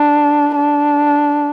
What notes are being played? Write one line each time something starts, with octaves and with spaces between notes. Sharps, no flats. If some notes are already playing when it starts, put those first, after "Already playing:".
Already playing: D4
D4